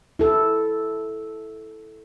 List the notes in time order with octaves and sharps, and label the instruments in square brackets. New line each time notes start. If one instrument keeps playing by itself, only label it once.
[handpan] E4 A4